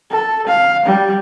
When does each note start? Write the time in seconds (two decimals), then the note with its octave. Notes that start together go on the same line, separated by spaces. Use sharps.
0.11 A4
0.47 F5
0.86 G3